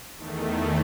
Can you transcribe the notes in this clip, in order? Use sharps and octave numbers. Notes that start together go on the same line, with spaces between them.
E2 D#3 A3